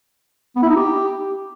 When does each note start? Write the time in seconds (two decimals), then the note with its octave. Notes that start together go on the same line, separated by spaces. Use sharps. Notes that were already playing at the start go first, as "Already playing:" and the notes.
0.56 B3
0.63 E4
0.69 D#4
0.76 G4